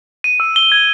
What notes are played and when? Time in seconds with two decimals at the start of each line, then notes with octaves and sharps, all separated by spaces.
0.24 D#7
0.40 E6
0.56 G7
0.72 G#6